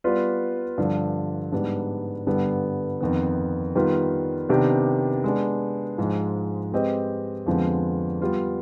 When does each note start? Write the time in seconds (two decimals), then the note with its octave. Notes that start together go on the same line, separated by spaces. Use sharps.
0.04 G3 B3 F4 B4 D5
0.78 G2 D3 F3
1.52 G#2 G3 B3 D4
2.27 G2 D3 G3 B3
3.00 F2 D#3 B3
3.75 D#3 G3 B3 F4 B4
4.49 C3 D#3 B3 D4 G4
5.24 G#3 B3 D4
5.98 G#2 F3 G#3
6.72 G#3 C4 G4 B4 D#5
7.46 F2 D3 F3 G#3 B3
8.22 G3 B3 F4